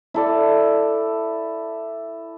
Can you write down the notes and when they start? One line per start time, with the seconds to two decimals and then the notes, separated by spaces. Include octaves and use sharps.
0.14 E4 A4 D5